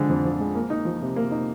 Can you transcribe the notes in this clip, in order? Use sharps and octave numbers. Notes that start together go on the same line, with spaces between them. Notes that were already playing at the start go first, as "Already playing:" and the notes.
Already playing: D3 F3 G#3
F2
F3
G#3
A#3
D#4
F3
C3
A#3
D#4